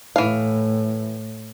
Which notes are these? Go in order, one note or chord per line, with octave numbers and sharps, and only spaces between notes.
A2 E3 F5